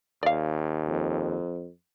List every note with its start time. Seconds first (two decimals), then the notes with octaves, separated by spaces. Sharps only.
0.23 D#2 D5 F5
0.88 F2